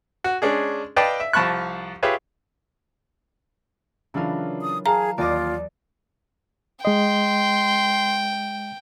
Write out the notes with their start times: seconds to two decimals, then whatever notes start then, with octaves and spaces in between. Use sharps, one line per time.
0.24 F#4
0.42 G#3 C#4 D4 G#4
0.96 B4 D5 D#5 F5 G5 A5
1.20 E5
1.33 C2 F3 A5 B5 C#6 F#6
2.03 F4 G4 G#4 B4 C#5 E5
4.14 C#3 E3 F#3 D4 F4 A#4
4.62 D#6
4.86 G#4 F5 A5 A#5
5.18 D#2 F4 D5 D#5 D6
6.85 G#3 D#5 G5 C6